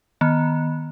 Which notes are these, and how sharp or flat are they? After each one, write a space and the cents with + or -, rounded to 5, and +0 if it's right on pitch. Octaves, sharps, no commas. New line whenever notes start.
D#3 +0 B3 -15